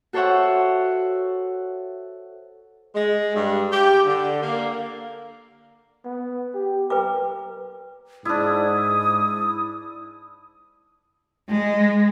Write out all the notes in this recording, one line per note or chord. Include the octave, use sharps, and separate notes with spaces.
F#4 A4 C5 C#5 E5 F#5
G#3
G2
G4
D3
A#3
B3
G4
A#4 B4 G5 D6
G#2 D4 E4 D#6
G#3